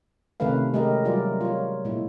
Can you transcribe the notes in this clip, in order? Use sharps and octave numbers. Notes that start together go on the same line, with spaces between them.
C3 D#3 A3 C#4 B4 F5
G#3 A3 C#4 G4 A#4 D#5
F#3 G3 F4 A#4 D5
F4 C#5
A#2 G#3 E4